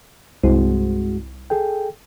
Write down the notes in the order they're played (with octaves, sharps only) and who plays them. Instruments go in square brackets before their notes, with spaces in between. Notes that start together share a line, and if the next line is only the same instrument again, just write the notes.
[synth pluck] C2 [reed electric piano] G2 G#3 F#4
[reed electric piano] G#4 A4 G5